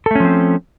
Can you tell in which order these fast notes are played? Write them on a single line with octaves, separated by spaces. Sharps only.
A4 A3 C#4 F3 C4